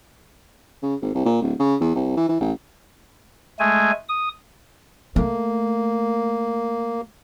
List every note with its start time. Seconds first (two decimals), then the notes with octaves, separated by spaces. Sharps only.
0.83 C#3
1.02 G#1
1.14 C2
1.25 A#2
1.42 D1
1.60 C#3
1.81 E2
1.95 C2
2.17 E3
2.28 E3
2.41 A1
3.59 G#3 A3 G#5
4.09 D#6
5.16 A3 A#3